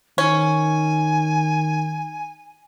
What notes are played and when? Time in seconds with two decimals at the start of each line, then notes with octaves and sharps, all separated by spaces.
0.18 D#3 C#4 G#5